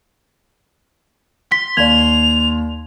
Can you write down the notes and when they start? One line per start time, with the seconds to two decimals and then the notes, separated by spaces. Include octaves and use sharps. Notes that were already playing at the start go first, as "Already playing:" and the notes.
1.52 C6 B6
1.77 D#2 D5 G#6 F7